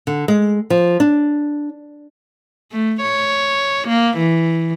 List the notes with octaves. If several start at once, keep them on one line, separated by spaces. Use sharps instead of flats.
D3
G#3
F3
D4
A3
C#5
A#3
E3